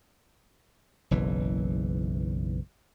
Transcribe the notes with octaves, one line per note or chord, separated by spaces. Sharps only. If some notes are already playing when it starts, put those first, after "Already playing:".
F#1 B1 E3